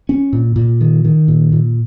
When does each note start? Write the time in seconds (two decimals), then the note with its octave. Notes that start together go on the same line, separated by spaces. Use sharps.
0.09 C#4
0.33 A#2
0.56 A#2
0.81 D#3
1.05 D#3
1.28 A#2
1.52 A#2